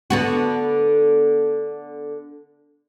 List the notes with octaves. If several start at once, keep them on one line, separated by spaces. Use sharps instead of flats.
D3 B3 F#4